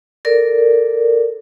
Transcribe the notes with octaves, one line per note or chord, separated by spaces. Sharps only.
A4 A#4 D5